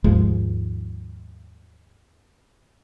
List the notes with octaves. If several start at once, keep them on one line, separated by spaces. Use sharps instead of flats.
D#2 G#2 F3 G#3